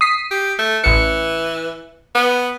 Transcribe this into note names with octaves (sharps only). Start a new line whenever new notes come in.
D#6 B6 C7
G4
A3
A1 E3 C#7
B3